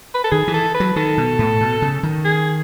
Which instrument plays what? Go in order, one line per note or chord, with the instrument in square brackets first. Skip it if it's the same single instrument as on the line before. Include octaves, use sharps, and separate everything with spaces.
[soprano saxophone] B4
A4
[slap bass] D#3 [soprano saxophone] G#4
[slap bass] E3
[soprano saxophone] A4
B4
[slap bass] F#3
[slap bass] D#3 [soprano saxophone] A4
[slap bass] B2
A2
B2
C#3
D#3
[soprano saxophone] G#4